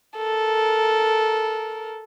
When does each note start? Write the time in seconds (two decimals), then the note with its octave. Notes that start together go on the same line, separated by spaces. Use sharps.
0.17 A4 A#4